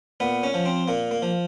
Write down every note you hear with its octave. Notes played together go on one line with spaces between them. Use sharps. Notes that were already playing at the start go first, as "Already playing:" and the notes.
A#2 B3
C#4
F3
C4
A#2 A#3
A#3
F3